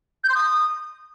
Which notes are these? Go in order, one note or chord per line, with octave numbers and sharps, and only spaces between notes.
G6
C6
D#6